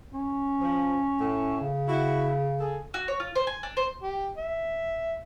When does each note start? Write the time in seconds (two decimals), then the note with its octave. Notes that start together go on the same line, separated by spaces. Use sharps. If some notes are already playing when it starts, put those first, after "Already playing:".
0.13 C#4
0.61 F3
1.19 A2
1.61 C#3
1.88 E4 F#4
2.60 G#4 A4
2.94 F#4
3.08 C#5
3.20 F4
3.35 C5
3.47 G#5
3.63 D4
3.77 C5
4.03 G4
4.37 E5